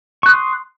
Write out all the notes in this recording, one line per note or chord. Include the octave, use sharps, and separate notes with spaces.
C6 C#6 D#6 F#6